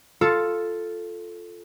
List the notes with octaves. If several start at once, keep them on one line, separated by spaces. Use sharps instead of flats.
F4 A4 C#7